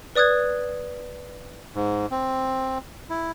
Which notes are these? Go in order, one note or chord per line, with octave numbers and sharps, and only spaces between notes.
B4 D5 D#6 F#6 G#6
G#2
C4
E4